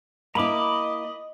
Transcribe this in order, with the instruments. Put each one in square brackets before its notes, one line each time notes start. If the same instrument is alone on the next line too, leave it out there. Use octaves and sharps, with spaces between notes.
[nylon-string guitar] A#3 E4 [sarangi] D#5 [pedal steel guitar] A#5 B5 D6